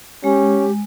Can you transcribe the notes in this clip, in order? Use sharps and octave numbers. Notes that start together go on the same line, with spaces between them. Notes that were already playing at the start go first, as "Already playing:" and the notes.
G#3 C#4 G4